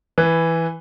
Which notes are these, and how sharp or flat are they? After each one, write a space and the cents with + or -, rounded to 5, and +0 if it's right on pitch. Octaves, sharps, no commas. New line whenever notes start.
E3 +0 B4 +0